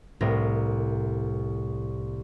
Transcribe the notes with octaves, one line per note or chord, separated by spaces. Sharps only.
C2 A2 C4 A#4 A#6